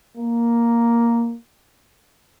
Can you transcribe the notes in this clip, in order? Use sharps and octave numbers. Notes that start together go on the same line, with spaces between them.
A#3